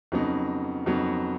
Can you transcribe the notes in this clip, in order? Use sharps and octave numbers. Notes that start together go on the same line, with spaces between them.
F2 C#3 F#3 B3 D#4
F2 C#3 F#3 B3 D#4